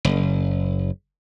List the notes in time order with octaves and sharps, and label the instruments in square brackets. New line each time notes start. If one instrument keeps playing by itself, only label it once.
[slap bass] F#1